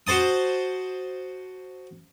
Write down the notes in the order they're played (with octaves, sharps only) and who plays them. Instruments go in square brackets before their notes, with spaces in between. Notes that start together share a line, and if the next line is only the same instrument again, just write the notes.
[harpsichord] F#4 C5 A5 D#6